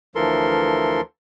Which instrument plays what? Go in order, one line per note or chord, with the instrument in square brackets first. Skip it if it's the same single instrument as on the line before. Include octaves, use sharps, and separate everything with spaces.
[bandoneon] D2 E3 F3 A4 A#4 C6